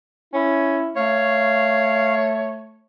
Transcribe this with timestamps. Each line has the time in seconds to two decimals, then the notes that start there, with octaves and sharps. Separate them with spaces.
0.34 C#4 E4
0.96 A3 C#5 F5